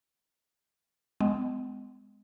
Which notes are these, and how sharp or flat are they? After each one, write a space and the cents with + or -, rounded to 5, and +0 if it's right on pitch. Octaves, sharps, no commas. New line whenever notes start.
G#3 +0 B3 +45